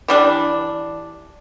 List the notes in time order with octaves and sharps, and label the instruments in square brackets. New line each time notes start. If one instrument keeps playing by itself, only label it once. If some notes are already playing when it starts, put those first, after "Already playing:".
[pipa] E3 G3 D4